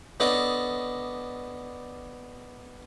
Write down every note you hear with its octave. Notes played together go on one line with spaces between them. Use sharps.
B3 D4 A4 C#5 D#5